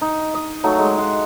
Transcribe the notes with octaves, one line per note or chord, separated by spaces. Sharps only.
D#4
D#5
F#3 A3 D#4
G#3
G#3 F#5